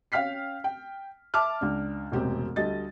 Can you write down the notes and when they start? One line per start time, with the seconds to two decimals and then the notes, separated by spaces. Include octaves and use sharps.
0.12 C#4 F5 G5 F6 B6 C7
0.64 G5
1.34 E5 A5 D6 F6
1.61 C#2 D4
2.12 E1 A1 C3 C4 G4
2.56 D2 G3 A3 D#5 A6